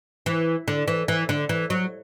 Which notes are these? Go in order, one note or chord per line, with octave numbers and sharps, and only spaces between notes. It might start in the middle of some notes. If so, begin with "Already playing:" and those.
E3
D3
E3
E3
D3
E3
F#3